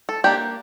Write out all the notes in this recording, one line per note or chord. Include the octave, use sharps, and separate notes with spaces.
A4
A#3 D4 G4